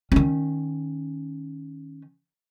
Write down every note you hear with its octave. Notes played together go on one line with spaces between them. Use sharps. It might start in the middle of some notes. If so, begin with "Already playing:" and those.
D#3 C#4